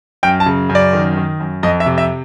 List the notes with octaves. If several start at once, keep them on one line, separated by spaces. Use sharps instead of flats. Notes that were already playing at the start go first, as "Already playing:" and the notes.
F#2 G5
A5
C#3
F#2
D5
D#3
D#3
F#2
F2 D#5
E5
C3
E5